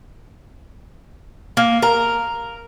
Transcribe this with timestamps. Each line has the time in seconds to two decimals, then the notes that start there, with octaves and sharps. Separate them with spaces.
1.57 A#3
1.82 A#4